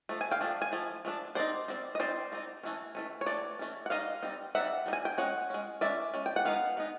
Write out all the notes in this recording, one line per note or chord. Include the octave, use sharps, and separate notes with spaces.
F3 A3
G#5
F5 G5
F3 A3 D4
G#5
F3 A3
F3 A3 D4
G3 C4 D#4 C5 D5
G3 C4 D#4
D#5
G3 C4 D#4 C5 D5
G3 C4 D#4
E3 A3 C#4
E3 A3 C#4
C#5
E3 A3 D5
E3 A3 C#4
F#5
G3 C4 D#4 D#5 F5
G3 C4 D#4
G3 C4 D#4 E5 F#5
G3 C4 D#4
G#5
G5
G#3 C#4 F#5
G#3 C#4
G#3 C#4 D5 E5
G#3 C#4
G5
F#5
G#3 B3 D#4 F5
G#3 B3 D#4